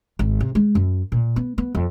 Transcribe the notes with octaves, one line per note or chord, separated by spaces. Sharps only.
G#1
C3
G#3
F#2
A#2
B3
B3
F2